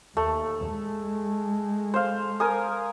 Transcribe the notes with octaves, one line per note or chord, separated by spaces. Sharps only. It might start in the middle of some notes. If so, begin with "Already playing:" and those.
D#2 A3
G#3
C5 F5
A#4 G#5 D#6